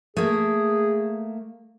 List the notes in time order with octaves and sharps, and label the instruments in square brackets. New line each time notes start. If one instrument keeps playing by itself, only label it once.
[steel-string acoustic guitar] A3 A#3 [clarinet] G#4